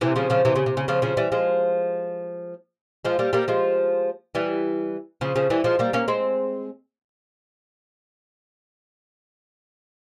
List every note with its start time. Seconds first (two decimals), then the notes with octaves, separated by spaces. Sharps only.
0.01 C3 E3
0.16 C#3 F3
0.30 C#3 F3
0.45 C3 E3
0.56 C#3
0.66 C3
0.77 C#3
0.88 C#3 F3
1.02 C#3 F3
1.17 E3 G3
1.32 F3 G#3
3.05 F3 G#3
3.19 G3 A#3
3.33 G3 A#3
3.48 F3 G#3
4.35 E3 G3
5.21 C#3 F3
5.36 C#3 F3
5.50 E3 G3
5.64 F3 G#3
5.79 G3 A#3
5.93 A#3 C#4
6.08 G#3 C4